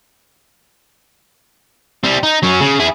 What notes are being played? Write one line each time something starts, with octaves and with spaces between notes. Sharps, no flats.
G3 C4
D#4
F#3 C#4
C#3
E4 G#4